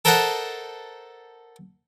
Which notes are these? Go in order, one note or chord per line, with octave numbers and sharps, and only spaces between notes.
A4 A#4 C5 D#5 F#5 A5